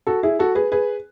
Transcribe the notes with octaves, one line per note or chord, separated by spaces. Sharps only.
F#4 A4
E4 G#4
F#4 A4
G#4 B4
G#4 B4